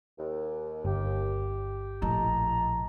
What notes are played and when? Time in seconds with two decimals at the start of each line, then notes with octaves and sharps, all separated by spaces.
0.18 D#2
0.85 G1 G4
2.02 A#1 A2 D#5 A5 A#5